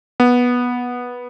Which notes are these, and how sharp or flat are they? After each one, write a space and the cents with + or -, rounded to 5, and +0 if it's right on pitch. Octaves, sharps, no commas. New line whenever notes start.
B3 -10